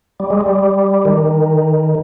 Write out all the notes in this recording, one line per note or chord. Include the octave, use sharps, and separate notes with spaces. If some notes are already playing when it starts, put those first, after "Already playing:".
G3
G#3
G3
D#3